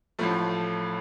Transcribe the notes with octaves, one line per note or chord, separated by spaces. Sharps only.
A1 A2 F3 A3